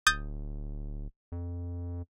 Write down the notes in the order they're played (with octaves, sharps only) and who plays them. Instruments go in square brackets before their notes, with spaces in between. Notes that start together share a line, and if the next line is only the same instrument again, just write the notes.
[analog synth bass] D1 [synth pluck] D#6 G6 A6
[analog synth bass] F2